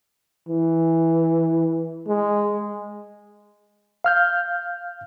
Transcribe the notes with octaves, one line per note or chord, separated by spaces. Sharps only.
E3
G#3
F5 F6 G6